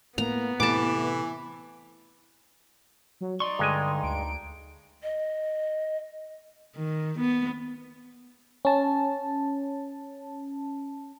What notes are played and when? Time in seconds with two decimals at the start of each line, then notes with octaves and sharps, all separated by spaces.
0.18 A2 A#3 B3 A#5
0.60 A2 C3 E3 A3 A5 D6
3.21 F#3
3.40 D#4 D5 C6 C#6
3.59 G2 D3 G#3 G#5
4.03 D2 D7
5.03 D#5
6.76 D#3
7.19 B3
8.65 C#4 A5